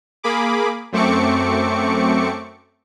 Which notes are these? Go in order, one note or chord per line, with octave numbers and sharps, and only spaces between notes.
A#3 G#4 B5 D6
F#2 A3 C4 C#6 D6 C#7